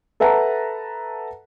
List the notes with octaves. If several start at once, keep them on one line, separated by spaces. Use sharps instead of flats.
A4 B4 E5 F#5 A5 A#5